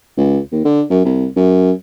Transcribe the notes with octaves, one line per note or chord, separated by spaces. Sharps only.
C#2
D#2
D3
F#2
C2
F#2